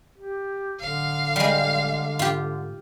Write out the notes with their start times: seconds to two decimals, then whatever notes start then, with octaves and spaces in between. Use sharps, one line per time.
0.18 G4
0.80 D1 D3 F5
1.36 G3 G#3
2.19 G#2 F4 G4